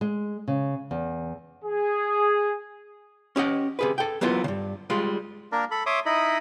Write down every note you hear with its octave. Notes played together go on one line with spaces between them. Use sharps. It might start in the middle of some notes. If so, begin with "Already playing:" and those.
G#3
C#3
E2
G#4
C#4 G4 D#5 F#5
C3 G#4 B4
A4 G5
F#3 A#3 B3 E4 F4
G2 C#3
G3 G#3 F4
A#3 D4 A#4
A4 B5
C#5 E5 C6 D6 D#6
D#4 E4 D#5 B5